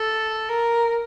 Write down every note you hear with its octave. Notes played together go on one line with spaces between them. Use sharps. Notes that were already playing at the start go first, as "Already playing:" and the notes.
Already playing: A4
A#4